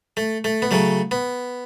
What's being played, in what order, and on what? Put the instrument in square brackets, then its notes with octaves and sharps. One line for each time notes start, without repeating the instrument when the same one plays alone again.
[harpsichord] A3
A3
B3
C#3 F#3 A3
B3